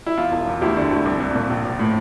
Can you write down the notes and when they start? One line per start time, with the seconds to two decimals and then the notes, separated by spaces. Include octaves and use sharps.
0.06 E4
0.18 E2 F4
0.32 E1
0.47 E2
0.61 D2 E4 G4
0.76 D3
0.91 D2
1.06 C2
1.20 C2
1.35 A#2
1.50 A#1
1.65 A#1
1.79 A2